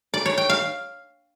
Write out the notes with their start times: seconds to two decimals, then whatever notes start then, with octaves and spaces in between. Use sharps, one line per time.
0.14 D5
0.26 C#5
0.38 G5
0.50 F5